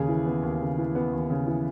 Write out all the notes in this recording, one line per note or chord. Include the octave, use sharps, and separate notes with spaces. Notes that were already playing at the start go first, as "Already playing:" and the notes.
Already playing: D#2 C#3 G#4
E3
B3
D#2
C#3
E3
B3
D#2
C#3
E3